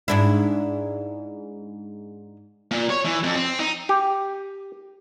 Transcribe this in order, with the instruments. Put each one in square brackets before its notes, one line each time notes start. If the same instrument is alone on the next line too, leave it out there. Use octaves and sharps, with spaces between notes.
[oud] G#2 D4 E4
[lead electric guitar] A#2
C#5
E3
F2
C4
D#4
[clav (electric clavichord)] G4